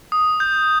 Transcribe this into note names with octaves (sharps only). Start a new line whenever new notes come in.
D#6
G6